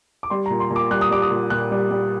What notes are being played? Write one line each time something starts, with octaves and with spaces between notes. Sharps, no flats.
D6
G3 C6
A#2 A#5
C6
A#2
D6
G3 F#6
D#6
G3 D6
D#6
A#2
A#2 F#6
G3
G3